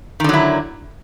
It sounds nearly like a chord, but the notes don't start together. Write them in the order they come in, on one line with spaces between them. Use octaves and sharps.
D#3 D3 F#3 E4